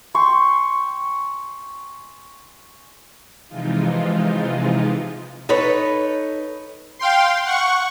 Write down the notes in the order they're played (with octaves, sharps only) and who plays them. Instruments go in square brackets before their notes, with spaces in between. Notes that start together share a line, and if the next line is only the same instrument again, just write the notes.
[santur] G5 G#5 C6 C#6
[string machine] C3 E3 F3 G#3 D#4 F4
[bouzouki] D#4 A4 B4 C#5
[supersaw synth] F5 G5 C6
F#5 C#6